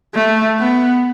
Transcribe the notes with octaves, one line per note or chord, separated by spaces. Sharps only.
A3
B3